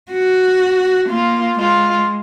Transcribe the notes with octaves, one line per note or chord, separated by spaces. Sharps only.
F#4
A#3 F4
G#3 F4